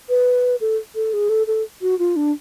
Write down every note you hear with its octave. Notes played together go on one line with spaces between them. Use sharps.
B4
A4
A4
G#4
A4
A4
F#4
F4
D4